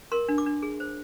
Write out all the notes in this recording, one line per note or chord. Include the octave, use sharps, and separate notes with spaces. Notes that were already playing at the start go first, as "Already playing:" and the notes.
A#4 C6
D4
D6
D4
G#4
C5